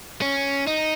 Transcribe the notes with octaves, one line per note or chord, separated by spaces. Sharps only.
C#4
D#4